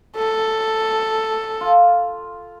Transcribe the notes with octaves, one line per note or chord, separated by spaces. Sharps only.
A4
F4